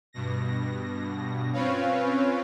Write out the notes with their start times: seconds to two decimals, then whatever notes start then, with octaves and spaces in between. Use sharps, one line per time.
0.13 G2 B2 A#6
1.53 C4 C#4 F4 B4 C#5 F5